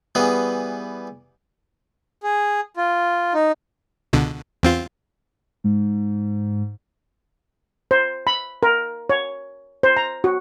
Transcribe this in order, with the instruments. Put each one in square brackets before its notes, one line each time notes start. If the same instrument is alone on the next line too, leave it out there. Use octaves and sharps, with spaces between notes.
[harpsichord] E3 G3 B3 G#4
[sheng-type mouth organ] G#4
F4
D#4
[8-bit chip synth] C#2 B2 D3
E2 C4 F4
[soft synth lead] G#2
[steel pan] C5
B5
A#4
C#5
C5
A#5
F#4